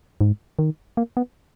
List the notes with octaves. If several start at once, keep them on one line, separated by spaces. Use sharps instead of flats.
G#2
D#3
A#3
B3